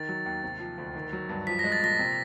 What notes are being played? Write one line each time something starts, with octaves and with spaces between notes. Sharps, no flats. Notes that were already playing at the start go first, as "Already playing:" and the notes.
Already playing: D#3 A6
F#3
D#2
C3
F3
D2
D#3
F#3
G2
F3 B6
A#6
G#3
A6
A#2 A#6
C3